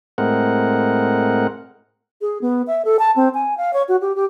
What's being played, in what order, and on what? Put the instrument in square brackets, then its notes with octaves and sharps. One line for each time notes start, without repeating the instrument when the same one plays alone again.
[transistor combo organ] A2 G#3 C4 A#4 F#5
[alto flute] G#4
B3
E5
A4
A5
C4
G#5
F5
C#5
F#4
G4
G4